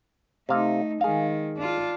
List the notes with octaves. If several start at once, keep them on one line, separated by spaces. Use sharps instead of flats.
C3 A3 D#4 F5
D#3 G#3 G#4 F5
D4 F4